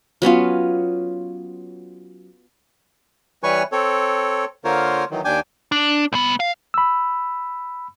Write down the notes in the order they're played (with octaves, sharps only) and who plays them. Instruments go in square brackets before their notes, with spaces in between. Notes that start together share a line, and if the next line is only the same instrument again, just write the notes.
[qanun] F#3 B3 C#4 F4
[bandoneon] E3 G3 B4 C#5 G#5 C#6
C4 A4 C#5
D3 A#3 F4 A#4 C5 C#5
D#3 E3 F#3
D#2 D4 G5 G#5 D6
[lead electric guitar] D4
C2 B3
F5
[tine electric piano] B5 E6